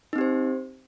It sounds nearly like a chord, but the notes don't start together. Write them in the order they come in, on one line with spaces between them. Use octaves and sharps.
D#4 C4 G4 C5